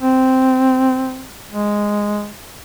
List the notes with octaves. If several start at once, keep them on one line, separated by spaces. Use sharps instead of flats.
C4
G#3